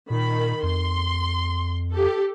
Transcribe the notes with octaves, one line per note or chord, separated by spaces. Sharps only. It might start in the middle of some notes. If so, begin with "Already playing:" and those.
A#2 D#3 B5
F2 C6
G4 A4